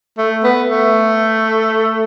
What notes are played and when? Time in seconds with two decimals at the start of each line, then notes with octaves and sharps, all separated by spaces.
0.18 A3
0.44 B3
0.69 A3